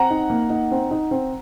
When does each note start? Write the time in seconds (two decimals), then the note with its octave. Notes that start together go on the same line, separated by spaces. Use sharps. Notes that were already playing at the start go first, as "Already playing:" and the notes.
Already playing: C4 F#5 A#5
0.10 D#4
0.30 A#3
0.50 D#4
0.71 C4
0.91 D#4
1.11 C4